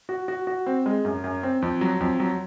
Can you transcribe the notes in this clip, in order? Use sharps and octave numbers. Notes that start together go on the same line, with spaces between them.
F#4
F#4
F#4
C4
G#3
F#2
F#2
C4
F2
F#3
F2
F#3